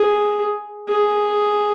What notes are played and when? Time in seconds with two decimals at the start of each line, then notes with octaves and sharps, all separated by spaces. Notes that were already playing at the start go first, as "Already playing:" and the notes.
Already playing: G#4
0.89 G#4